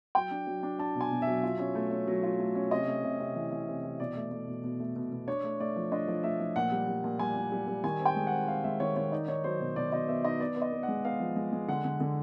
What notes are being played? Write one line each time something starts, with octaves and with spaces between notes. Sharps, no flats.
F#3 G5
D4
F#3
D4
D4 A5
B2
G#5
B2
E5
F#3
F4
C#4
A3
C#4
F#3
F4
A3
C#4
C3 D#5
A3
C3
C3
E3
E3
C3
E3
B2 D5
A3
A3
B2
B2
A3
B2
B2
D4 C#5
A3
A3 D5
F3
D4 D#5
F3
A3 E5
F3
A#2 F#5
G3
G3
A#2
G3 G#5
A#2
G3
G3
D#3 G#5
C4
G5
G#3
F#5
C4
C4 F5
G#3 E5
D#3 C#5
D#3 C#5
D#4 D5
D#4 C#5
F#3 C5
B2 C#5
B2 D5
B2 D#5
B3 E5
D#4 D#5
B3 D5
B3
D#5
B3
F#5
G#3
B3 F5
F3
G#3
G#3
D3 F#5
D3
D3